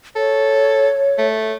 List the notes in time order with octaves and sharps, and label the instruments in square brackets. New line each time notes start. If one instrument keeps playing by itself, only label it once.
[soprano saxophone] A4 [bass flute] C#5
[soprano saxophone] A3